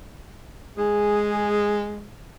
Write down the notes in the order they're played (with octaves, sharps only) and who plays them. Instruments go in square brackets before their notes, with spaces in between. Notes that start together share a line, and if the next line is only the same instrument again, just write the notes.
[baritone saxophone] G#3 [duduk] G#4